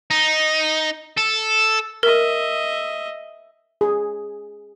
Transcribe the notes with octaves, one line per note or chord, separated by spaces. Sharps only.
D#4
A4
A#4 D#5 E5
G#4